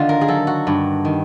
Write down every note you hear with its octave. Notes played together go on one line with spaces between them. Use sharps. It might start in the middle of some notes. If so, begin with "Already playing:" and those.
Already playing: D3 D#3 F4
A#4
G#4
F#3 A4
F#4
G2
D#3